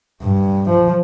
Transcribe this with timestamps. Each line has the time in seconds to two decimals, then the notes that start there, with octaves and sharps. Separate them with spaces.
0.22 G2
0.70 F3